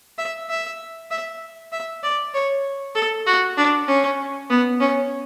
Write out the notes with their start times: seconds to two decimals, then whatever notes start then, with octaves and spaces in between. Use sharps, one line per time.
0.18 E5
0.50 E5
1.11 E5
1.72 E5
2.03 D5
2.34 C#5
2.95 A4
3.27 F#4
3.57 D4
3.88 C#4
4.50 B3
4.81 C#4